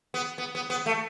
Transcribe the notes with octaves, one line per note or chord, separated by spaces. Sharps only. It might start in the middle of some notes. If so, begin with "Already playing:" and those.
B3
B3
B3
B3
A3